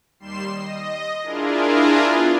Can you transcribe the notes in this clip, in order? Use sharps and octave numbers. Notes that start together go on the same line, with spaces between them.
D#2 G3 C6 C7 E7
D#5
D4 E4 F4 G#4 A#4
B3 F4